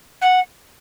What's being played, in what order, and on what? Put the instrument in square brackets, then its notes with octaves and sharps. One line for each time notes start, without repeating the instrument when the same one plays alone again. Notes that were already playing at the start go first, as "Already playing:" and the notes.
[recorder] F#5